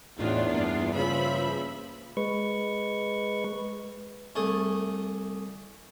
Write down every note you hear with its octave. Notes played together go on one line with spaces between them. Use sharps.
E2 A2 B3 D4 D#4 F4
G2 A#3
C#3 F3 E5 B5
G#3 B4 C#6
C2 A3 G#4